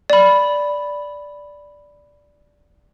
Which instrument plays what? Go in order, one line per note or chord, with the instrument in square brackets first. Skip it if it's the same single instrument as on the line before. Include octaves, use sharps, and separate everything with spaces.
[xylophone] D5 B5